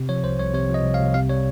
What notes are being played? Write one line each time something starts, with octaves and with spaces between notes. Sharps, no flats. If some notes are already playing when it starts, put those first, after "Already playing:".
Already playing: C3
F3 C#5
C2 C5
C2 C#5
C3 C#5
F3
D#5
C2
F5
C2
C3 F5
G3 C#5